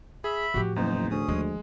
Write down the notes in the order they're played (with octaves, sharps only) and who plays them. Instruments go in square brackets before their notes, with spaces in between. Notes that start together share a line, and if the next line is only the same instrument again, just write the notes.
[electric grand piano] G#4 [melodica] E5 B5
[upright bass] A2 F3 [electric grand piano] F#4 G4
[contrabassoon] F#1 [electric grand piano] E2 [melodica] D#4 C5
[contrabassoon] D2 [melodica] C#4 G#4 D#6
[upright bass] D#2 F3 [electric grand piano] G#3